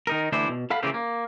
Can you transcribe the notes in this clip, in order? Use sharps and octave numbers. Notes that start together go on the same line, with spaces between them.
D#3 D#4 A#4
D2 E3 D4 E4 C5
B2
A4 F5 F#5 B5
C#3 E3 A3 A#3 C4 G4
A#3